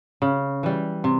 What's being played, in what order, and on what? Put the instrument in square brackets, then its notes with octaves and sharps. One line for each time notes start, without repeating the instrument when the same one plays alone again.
[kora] C#3
E3 G3
C3